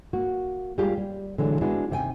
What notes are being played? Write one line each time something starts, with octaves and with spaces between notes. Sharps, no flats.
A#3 F#4
G3 G#3 A#3 F4 G4 G#4
G3
A#2 D3 E3 F#3 G#3 D4
G#3 B3 D4 E4 F#4
D#2 C3 D#5 G5 G#5